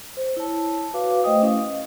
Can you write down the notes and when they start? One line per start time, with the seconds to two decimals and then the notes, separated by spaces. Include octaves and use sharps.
0.17 C5
0.37 E4 C#5 A5
0.94 F#4 B4 F5 D6
1.24 A3 C5 D#5 G5 D#6
1.42 C#4 E4 F5
1.61 D#5